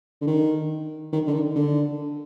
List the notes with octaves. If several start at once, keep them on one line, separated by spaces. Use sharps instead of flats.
D3
D#3
D#3
D3
D#3
D3